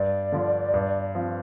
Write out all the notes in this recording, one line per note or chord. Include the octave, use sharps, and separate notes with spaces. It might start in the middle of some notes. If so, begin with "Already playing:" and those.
Already playing: G2 D5
D3 F3
G2
F3 C4